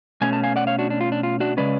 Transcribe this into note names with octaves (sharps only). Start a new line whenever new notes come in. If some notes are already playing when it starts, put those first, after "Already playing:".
B2 A3 C#4 G#5
A5
F5 G#5
D5 F#5
C#5 F5
D4 F#4
D4
F4
D4
F4
D4 F#4
C#3 G#3 C#4 B4 D5